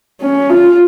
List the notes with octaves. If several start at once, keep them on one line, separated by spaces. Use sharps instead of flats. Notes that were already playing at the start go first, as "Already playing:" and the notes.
C#4
F4